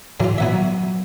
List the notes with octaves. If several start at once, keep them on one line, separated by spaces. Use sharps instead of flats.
G#2 E3 F#3 F4
A#2 E3 B3 E5 F#5 G#5
F#3